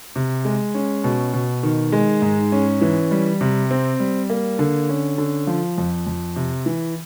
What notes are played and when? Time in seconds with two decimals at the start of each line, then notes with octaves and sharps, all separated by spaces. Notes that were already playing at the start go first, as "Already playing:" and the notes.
0.16 C3
0.45 G#3
0.75 C#4
1.04 B2
1.33 B2
1.63 D#3
1.92 G#3
2.22 G#2
2.52 C#4
2.81 E3
3.11 G3
3.41 C3
3.71 C4
4.00 G3
4.30 A#3
4.59 D3
4.89 C#4
5.18 D3
5.47 F3
5.78 F2
6.07 F2
6.36 C3
6.66 E3